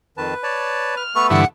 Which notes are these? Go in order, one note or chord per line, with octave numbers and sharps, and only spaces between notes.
F2 D#3 B4 A5
C#5 D5 A5
F6
A3 B3 A4 B4 C#6
G2 D3 E3 F#5